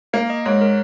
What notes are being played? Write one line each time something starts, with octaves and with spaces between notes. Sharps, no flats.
A#3 F5
D#5
G#2 C#5
A#4